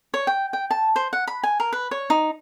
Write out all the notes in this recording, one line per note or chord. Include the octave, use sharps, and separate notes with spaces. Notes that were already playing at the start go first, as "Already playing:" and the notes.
C#5
G5
G5
A5
C5
F#5
B5
G#5
A#4
B4
C#5
D#4